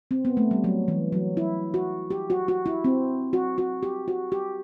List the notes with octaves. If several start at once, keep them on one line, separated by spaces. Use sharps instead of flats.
C4
B3
A3
G3
F#3
E3
F#3
E4
F#4
G4
F#4
F#4
E4
C4
F#4
F#4
G4
F#4
G4